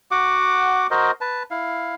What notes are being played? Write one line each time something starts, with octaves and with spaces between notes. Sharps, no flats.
F#4 F#5 D6
F#4 A#4 C5 D#5
B4 A5
E4 F5